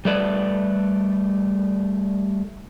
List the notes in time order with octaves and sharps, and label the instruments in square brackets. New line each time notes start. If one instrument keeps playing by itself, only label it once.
[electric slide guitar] G3 A3 A4 B4 D5